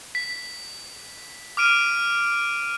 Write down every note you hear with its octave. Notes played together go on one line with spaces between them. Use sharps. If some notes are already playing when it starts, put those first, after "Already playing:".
B6
D6 F6 D7 D#7